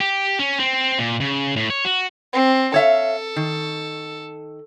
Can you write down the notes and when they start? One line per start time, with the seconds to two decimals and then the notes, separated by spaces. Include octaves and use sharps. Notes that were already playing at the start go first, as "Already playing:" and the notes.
0.01 G4
0.39 C#4
0.60 C4
0.99 A#2
1.21 C#3
1.56 A2
1.70 C#5
1.85 F#4
2.33 C4
2.74 A4 C#5 E5 F5
3.36 D#3